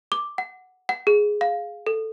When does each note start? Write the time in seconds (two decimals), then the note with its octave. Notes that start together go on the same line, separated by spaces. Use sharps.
0.12 D6
0.38 F#5
0.89 F#5
1.07 G#4
1.41 F5
1.87 A4